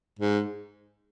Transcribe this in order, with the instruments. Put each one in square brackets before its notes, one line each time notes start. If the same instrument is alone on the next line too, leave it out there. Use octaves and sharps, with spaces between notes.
[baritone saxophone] G#2